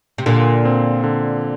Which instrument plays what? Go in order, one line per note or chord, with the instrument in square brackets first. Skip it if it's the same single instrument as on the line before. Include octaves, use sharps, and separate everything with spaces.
[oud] C3
[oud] A#2 [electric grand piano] D3
[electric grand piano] C4
D3